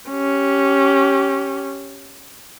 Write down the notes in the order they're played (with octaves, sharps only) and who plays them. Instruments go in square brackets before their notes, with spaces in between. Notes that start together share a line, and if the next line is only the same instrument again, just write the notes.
[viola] C#4 G4